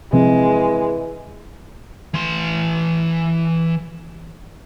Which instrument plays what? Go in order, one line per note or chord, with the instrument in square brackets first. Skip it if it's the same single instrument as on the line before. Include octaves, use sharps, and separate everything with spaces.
[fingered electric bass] C3 F3 C4 [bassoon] E3 [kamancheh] G#3
[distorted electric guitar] E3 C6